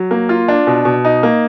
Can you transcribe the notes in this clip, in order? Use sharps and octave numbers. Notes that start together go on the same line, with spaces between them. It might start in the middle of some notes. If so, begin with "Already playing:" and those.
Already playing: F#3
A#3
F4
D4
B2
B2
D#4
A#3